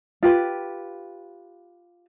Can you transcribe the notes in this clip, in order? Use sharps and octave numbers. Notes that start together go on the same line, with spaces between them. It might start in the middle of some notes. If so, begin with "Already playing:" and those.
F4 G4 B4